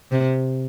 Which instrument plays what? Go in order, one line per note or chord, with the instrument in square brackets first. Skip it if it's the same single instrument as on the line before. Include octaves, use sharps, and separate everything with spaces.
[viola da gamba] C3